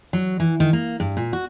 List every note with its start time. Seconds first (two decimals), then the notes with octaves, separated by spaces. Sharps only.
0.13 F#3
0.40 E3
0.60 D#3
0.73 A#3
1.00 G2
1.17 A#2
1.33 F#4